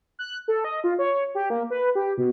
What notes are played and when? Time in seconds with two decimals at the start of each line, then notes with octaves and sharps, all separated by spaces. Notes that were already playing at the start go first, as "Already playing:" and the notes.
0.19 F#6
0.48 A4
0.64 D#5
0.84 F4
0.99 C#5
1.35 G4
1.50 A#3
1.70 B4
1.95 G4
2.18 B2